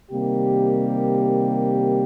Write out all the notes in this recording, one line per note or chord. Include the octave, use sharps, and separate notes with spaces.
C3 D#3 G3 A#3 G4